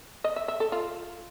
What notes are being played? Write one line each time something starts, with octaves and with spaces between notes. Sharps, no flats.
D#5
E5
E5
A4
F4